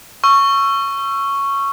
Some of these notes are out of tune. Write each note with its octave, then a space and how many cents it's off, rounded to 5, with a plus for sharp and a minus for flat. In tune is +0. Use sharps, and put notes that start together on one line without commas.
C#6 +0 E6 +40